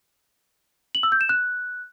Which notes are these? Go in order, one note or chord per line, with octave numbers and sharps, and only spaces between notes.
F#7
E6
G6
E7
F#6